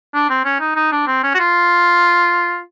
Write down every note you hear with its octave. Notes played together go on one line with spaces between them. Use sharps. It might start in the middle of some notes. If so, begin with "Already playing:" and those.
D4
C4
C#4
D#4
D#4
D4
C4
C#4
F#4
F4